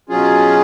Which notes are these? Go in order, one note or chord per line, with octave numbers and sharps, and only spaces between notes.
B2 F#3 C#4 F4 G#4